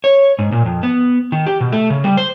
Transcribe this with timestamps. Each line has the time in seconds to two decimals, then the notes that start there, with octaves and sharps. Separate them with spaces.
0.04 C#5
0.39 G#2
0.52 A#2
0.66 F2
0.83 B3
1.32 D#3
1.46 G4
1.61 B2
1.73 A3
1.90 C#3
2.04 G3
2.17 C5